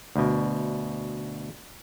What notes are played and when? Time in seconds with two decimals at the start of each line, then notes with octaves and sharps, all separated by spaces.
0.16 D2 B2